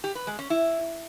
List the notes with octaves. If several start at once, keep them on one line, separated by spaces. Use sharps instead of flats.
G4
B4
G#3
C#4
E4